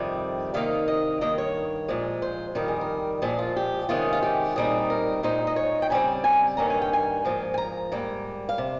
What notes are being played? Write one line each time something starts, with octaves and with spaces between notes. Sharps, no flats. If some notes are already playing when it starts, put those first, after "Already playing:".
Already playing: F2 C3 D#3 G3
C3 D#3 A#3 D#4 F5
D#5
G2 D#3 A#3 D#5
C#5
A#2 F3 G#3
C5
F2 D#3 G3 A#4
G#4
A#4
A#2 F3 G#3 G#4
F4
G4
C3 D#3 G#3 C#4 F4
F4
G4
A#2 G3 C4 D#4 G#4
A#4
A#2 G#3 D#4 C5
D#5
C#5
G5
C#3 G3 C4 G#5
G#5
G2 D#3 A#3 C#4 A#5
G#5
G5
G#5
G#2 F3 A#3
G#5
A#5
G#2 G3 A#3
F5
C3